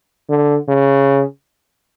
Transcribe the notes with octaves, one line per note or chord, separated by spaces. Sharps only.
D3
C#3